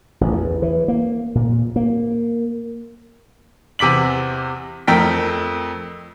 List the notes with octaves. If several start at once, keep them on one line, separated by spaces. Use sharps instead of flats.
A1
E2
E3
A#3
A#2
A#3
E2 C3 D6 B6 F#7
F2 A3 A#4 G5 B6